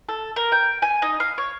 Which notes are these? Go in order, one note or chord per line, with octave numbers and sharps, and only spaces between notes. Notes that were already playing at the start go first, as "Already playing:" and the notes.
A4
A#4
G5
G#5
D#4
F5
C#5